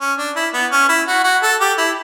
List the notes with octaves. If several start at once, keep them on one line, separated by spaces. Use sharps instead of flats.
C#4
D4
E4
B3
C#4
E4
F#4
F#4
A4
G4
E4